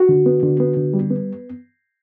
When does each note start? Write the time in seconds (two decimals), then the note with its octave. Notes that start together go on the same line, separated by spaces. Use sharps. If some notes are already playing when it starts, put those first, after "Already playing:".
Already playing: F#4
0.09 D3
0.26 B3
0.43 D3
0.60 B3
0.77 D3
0.94 G3
1.10 B3